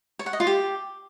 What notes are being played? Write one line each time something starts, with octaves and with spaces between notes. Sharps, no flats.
C#5
F#5
D#5
F4
G4